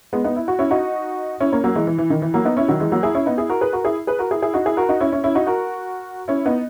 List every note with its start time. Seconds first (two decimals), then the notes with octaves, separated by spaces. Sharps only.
0.13 G#3 B3
0.24 B3 D#4
0.36 E4
0.48 F#4
0.59 C#4 E4
0.71 D#4 F#4
1.40 C#4 E4
1.52 A#3 C#4
1.64 F#3 A#3
1.75 E3 G#3
1.87 E3
1.98 E3
2.10 D#3
2.22 E3
2.34 F#3 A#3
2.45 B3 D#4
2.57 C#4 E4
2.68 D#3 F#3
2.80 E3 G#3
2.92 F#3 A#3
3.03 E4 G#4
3.15 C#4 E4
3.26 B3 D#4
3.38 E4 G#4
3.49 F#4 A#4
3.61 G#4 B4
3.73 F#4 A#4
3.85 E4 G#4
4.07 G#4 B4
4.19 F#4 A#4
4.31 E4 G#4
4.42 E4 G#4
4.54 D#4 F#4
4.66 E4 G#4
4.77 F#4 A#4
4.89 D#4 F#4
5.00 C#4 E4
5.12 C#4 E4
5.24 C#4 E4
5.35 D#4 F#4
5.47 F#4 A#4
6.28 C#4 E4
6.46 B3 D#4